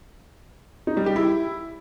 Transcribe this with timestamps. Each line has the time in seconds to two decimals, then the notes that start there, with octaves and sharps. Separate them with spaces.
0.87 D#4
0.97 G3
1.06 G4
1.16 E4